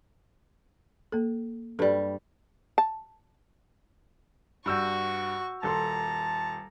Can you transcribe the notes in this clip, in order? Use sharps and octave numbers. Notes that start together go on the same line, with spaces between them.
A#3 A4
G2 G3 A4 B4
A5
G2 F#4 C#6 E6 G6
D#1 A4 A5 A#5 C6